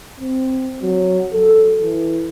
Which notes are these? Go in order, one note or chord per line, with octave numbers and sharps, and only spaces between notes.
C4
F#3
A4
E3